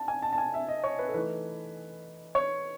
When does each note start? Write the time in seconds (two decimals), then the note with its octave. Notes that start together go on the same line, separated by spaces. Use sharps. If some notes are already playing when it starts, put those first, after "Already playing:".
Already playing: A5
0.08 G#5
0.22 A5
0.33 A5
0.38 G#5
0.54 E5
0.68 D#5
0.84 C#5
0.99 B4
1.07 A4
1.14 E3 A3 D#4 B4
2.35 C#5